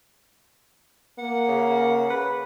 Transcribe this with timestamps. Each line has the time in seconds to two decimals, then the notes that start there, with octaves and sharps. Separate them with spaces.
1.19 A#3 F#5
1.48 C#3
2.10 B4